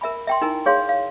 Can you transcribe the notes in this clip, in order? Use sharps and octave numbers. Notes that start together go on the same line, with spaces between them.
A#4 E5 G#5 B5
E5 G5 C6
D#4 E4 A#4 G5 G#5
G#4 C#5 F5 C6
F5